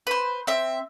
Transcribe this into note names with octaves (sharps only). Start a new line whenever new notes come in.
B4 C5
C4 E5